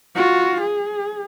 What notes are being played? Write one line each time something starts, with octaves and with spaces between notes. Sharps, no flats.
F4 F#4
G#4